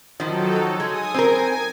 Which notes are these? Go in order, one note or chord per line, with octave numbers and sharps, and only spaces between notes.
D#3 F3 F#3 D#4 A4
G#3 G#5 D#6
C4 A#4 G#5